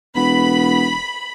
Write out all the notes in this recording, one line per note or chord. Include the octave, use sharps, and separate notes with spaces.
E1 B3 B5